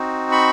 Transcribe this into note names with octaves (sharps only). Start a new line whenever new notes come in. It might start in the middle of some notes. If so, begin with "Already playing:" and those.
Already playing: C4 D#4 F#4
B5 C#6